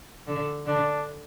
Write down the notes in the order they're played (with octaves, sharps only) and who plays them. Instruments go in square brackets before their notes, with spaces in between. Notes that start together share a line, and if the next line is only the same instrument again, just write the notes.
[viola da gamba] D3
[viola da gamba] D3 [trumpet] D4